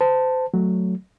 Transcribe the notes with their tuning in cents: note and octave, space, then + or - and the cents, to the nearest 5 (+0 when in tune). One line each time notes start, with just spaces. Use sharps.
C5 -30 A5 +10
F#3 +0 A3 +0